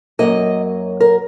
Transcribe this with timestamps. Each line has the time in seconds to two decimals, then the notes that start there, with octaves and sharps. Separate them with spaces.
0.19 F#2 D#3 F#3 A#3 D#5
1.01 A#4